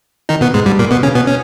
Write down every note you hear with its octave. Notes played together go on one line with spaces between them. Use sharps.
D#3 D#4
B2 B3
G#2 G#3
G2 G3
A#2 A#3
B2 B3
C#3 C#4
B2 B3
C#4